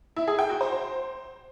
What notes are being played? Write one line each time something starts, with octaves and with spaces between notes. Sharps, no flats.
E4
G#4
G5
F#4
C5